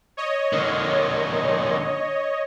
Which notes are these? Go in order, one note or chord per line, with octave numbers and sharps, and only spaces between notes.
C#5 D#5
D3 A#3